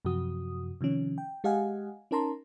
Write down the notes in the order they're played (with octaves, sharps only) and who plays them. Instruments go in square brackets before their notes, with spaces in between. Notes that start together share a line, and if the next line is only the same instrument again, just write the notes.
[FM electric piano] F#2 C3 F3 F#4 D#6
C3 D#3 F3 C#4
G5
G#3 G4 D#5 F5 F#5 G#5
C#4 D#4 A#4 A5 A#5 C6